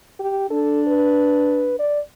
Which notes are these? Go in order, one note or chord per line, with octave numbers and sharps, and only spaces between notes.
G4
D4 A4
B4
D5